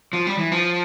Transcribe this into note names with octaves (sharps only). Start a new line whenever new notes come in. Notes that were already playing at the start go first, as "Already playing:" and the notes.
F3
G3
E3
F3